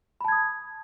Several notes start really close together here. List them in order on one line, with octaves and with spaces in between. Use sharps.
B5 A5 G#6 D#6